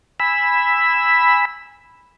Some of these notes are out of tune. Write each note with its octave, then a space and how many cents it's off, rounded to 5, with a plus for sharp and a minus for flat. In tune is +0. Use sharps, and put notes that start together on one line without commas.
G#5 -20 B5 +0 E6 +0